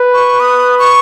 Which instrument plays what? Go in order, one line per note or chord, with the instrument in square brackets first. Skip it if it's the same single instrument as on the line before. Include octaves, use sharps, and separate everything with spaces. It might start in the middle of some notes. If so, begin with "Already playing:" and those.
Already playing: [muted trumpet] B4
[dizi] C#6
D#6
C#6